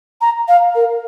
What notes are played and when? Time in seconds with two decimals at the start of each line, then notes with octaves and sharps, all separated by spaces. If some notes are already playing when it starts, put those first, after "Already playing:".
0.21 A#5
0.48 F5
0.75 A#4